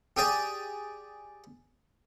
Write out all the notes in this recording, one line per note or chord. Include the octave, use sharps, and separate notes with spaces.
G4 G#4 D5